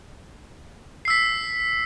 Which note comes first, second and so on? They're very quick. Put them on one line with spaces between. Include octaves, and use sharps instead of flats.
C7 E6 B6